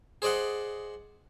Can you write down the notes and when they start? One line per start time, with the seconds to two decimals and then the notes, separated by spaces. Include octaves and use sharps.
0.22 G#4 C5 D5 D#5 F#5